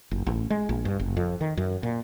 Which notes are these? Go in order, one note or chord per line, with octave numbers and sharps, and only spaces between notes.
F#1
A1
G#3
A#1
G2
F#1
F2
D#3
F#2
A#2